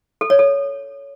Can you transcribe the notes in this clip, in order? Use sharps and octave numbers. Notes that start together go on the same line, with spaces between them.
A4
C#5
A4